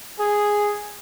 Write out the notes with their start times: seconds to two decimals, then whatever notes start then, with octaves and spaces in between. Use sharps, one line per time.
0.20 G#4